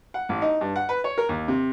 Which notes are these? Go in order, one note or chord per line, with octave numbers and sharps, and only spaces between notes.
F#5
A1
D#4
G2
F#5
B4
C#5
A#4
D#2
C3